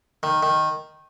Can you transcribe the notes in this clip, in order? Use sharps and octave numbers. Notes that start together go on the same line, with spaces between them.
D#3
D#3